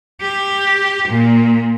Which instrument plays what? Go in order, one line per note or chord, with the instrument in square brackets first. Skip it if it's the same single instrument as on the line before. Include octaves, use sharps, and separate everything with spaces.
[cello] G4
A#2